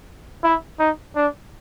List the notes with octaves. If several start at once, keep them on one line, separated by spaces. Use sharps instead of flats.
E4
D#4
D4